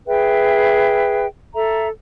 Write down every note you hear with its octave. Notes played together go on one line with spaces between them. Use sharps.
G#4 B4 E5 G5
A4 E5 A#5